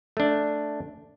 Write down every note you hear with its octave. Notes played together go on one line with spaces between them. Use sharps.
A3 D4